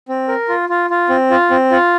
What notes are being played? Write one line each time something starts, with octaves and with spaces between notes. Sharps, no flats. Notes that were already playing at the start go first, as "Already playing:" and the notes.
C4
A#4
F4
F4
F4
C4
F4
C4
F4